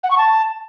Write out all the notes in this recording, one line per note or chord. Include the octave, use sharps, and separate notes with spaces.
F#5
C#6
A5